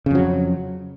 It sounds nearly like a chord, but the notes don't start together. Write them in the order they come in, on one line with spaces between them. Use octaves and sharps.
C#3 F2 F#3